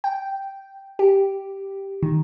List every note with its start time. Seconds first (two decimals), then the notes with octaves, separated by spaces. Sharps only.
0.04 G5
0.99 G4
2.03 D#3